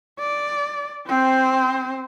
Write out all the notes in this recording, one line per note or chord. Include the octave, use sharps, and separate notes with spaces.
D5
C4 C5